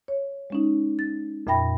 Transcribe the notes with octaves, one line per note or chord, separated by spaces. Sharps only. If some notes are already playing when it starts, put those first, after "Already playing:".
C#5
G#3 C#4 D#4
A6
F2 A#2 E5 G5 B5 A#6